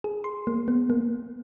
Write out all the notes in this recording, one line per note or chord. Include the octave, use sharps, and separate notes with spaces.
G#4
C6
A#3
B3
A#3